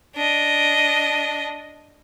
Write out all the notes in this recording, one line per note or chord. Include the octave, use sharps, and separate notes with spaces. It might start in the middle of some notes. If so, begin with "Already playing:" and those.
D4 D#5